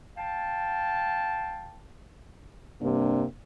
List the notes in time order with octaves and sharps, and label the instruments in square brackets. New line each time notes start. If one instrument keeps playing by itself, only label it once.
[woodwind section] F5 G5 A5
[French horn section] G2 C3 A#3 D4